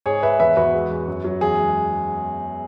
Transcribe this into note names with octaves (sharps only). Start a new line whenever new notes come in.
G#2 G#4 C#5
G#2 B4 E5
E2 B4 E5
E2 F#4 B4
G#3
E2
F#2
F#3
E2 G#4
G#3